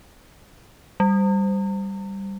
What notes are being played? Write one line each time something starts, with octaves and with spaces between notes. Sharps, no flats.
G3